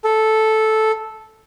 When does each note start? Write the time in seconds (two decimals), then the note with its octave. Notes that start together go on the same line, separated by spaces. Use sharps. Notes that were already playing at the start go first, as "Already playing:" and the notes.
0.05 A4